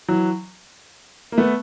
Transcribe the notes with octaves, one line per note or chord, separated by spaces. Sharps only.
E3 F#3
A#3
A3 B3